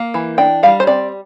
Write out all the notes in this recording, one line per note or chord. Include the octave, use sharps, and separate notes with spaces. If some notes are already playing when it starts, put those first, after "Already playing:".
Already playing: A#3
E3
D4 G5
G3 F5
C5
C4 D5